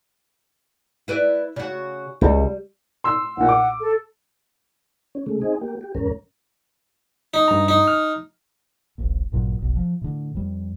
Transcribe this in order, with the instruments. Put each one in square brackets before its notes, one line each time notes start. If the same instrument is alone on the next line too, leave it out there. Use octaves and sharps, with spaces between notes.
[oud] E4 B4 D5
C#3 F#4
[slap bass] C#2 [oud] G3
[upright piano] C6 E6
[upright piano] B1 A#2 [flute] F#5
[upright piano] D6
[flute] A4
[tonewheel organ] C#4
C#3 G#3 A3
C4 D#4 G#4
A#3 G4
G4
E2 G#2 C#4 A#4
[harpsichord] D#4
[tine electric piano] G2 A#5
[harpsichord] D#4
[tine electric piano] F6
[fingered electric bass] D#1 A#1 A#2
A1 G2 A#2 F#3
F1 B1
F3
A2 D3
F2 G3